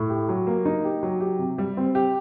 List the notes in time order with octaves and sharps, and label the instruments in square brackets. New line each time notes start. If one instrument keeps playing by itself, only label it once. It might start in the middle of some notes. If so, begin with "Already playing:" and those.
Already playing: [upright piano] A2
G4
F#3
A#3
D#4
G4
F#3
G4
C3
G3
C4
G4